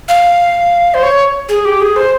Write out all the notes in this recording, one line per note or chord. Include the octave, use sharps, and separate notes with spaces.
F5
C5
C#5
G#4
G4
G#4
C5